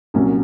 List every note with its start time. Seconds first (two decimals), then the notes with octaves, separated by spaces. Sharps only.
0.14 C2 A#2 F#3 C#4